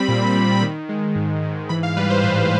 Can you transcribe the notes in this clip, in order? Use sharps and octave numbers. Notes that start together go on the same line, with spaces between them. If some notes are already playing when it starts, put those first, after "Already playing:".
Already playing: G3 C4 B5
A#2
A#2
D#3
G#3
G#2
G#2
E3 B5
F5
G3 B4
C5
A2 B4